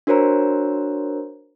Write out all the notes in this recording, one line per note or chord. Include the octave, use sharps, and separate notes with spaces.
D4 F#4 A#4 C5 C#5 A#5